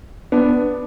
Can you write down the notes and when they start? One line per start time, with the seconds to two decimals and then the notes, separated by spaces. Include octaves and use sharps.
0.32 B3 D4